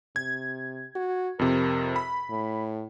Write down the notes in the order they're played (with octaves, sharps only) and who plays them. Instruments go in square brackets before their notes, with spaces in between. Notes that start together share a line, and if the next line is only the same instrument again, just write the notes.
[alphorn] C3 [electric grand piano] G#6
[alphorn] F#4
[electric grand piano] F2 C3 [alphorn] A#4
[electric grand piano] B5
[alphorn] A2